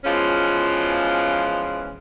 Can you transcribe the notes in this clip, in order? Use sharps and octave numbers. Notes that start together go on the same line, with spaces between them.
B2 E3 F3 G#3 C#4 F4